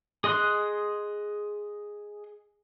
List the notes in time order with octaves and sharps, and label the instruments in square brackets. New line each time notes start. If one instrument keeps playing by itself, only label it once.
[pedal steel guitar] G#4 D#5 C6 F#6